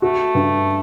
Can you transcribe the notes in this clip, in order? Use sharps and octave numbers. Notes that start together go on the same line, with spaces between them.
A3 F#4
G2